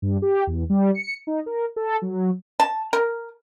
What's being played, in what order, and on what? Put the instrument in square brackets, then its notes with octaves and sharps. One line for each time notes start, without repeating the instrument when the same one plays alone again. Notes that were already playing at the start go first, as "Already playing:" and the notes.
[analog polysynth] G2
G4
E2
G3
C#7
D#4
A#4
A4
F#3
[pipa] A5
A#4